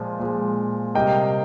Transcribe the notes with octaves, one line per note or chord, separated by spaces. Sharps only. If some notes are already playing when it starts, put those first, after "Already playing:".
Already playing: A#2 F3 G#3
A#2 F3 G#3
C3 G3 A#3 D#5 G5